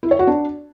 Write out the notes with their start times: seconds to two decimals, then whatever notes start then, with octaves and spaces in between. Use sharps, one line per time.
0.03 E4
0.11 C#5
0.19 F#4
0.27 D4